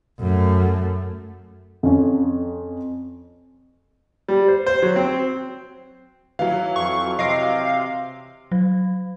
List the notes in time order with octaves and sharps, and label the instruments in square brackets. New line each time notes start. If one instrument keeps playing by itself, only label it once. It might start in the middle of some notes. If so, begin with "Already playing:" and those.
[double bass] F#2 A3
[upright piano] F2 C#4
[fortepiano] G3
C5
C5
F#3
C4
[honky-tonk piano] E3 F#3 [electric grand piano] F5
[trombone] F2 [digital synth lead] C#6
[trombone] C3 [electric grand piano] D#5 A#6 D7 [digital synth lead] F5
[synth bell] F#3